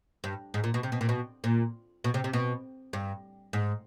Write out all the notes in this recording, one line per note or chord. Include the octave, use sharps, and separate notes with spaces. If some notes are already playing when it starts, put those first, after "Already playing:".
G2
G#2
A#2
B2
C3
B2
A#2
B2
A#2
B2
C3
C3
B2
G2
G#2